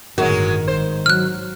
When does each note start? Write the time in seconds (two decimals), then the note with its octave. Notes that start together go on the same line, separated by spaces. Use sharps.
0.18 G1 A2 D#3 F#3 G#3 F#4
0.68 G#1 C5
1.06 F#3 F6 F#6